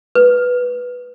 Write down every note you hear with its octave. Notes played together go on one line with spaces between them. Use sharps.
B4